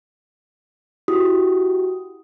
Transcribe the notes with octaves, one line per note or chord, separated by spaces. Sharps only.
E4 F#4 G4 D#6